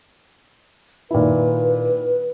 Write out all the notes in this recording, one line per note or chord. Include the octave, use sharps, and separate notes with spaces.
A#2 D#3 E4 B4